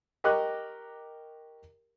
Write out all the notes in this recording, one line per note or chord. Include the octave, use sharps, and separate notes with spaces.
G4 A#4 D#5 C#6 D6 F#6